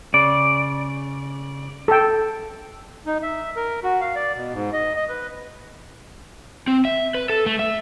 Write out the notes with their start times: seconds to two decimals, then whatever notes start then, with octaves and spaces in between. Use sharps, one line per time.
0.14 C#3 D5
1.88 A4 G5
3.06 D#4
3.23 E5
3.56 A#4
3.83 F#4
4.01 F5
4.15 D5
4.35 B2
4.53 G#2
4.73 D#5
4.96 D#5
5.09 B4
6.67 C4
6.85 E5
7.14 B4
7.30 A4
7.46 A3
7.59 E5